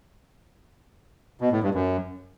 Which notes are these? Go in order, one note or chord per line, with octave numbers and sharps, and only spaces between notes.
B2
A2
G2
F#2